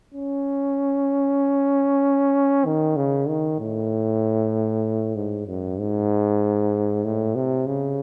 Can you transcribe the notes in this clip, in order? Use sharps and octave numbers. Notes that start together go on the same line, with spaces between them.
C#4
D#3
C#3
D#3
A2
G#2
F#2
G#2
A2
C3
C#3